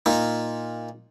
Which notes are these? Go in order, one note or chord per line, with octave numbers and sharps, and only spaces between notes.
A#2 D#4